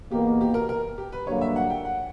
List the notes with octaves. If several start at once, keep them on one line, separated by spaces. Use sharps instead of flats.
E2 B2 A#3 G4
G4
A#4
A#4
G4
B4
G2 D3 F#3 A#3 C#5
E5
F#5
G5
F#5